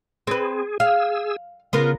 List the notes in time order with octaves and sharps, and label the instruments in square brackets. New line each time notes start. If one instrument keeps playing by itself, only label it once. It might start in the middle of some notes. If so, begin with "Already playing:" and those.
[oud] C4 B4 [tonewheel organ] G#4
[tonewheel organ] G#4 E6 [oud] F5
[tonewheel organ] C#3 [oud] B3 F4 A#4